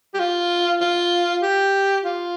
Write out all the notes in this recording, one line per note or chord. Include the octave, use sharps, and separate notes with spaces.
G4
F4
F4
G4
F4